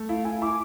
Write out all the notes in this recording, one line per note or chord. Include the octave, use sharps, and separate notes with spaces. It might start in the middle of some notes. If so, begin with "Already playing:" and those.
Already playing: A3
E4 F5
E4 G#5
E4 D6